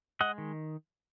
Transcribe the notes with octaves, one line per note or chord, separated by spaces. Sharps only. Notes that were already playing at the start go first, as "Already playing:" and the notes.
G#3 D#5 F#5
D#3